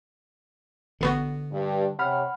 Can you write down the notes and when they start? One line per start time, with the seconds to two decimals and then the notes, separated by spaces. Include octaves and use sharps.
1.01 A1 D3 B3 F#4
1.51 G2
1.99 C3 C#5 F#5 B5 F6